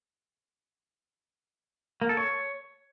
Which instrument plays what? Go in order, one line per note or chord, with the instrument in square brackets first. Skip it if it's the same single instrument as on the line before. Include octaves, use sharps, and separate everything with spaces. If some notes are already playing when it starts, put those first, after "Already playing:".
[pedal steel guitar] A#3
A4
C#5